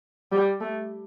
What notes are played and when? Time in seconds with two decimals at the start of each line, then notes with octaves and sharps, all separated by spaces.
0.32 G3
0.61 A3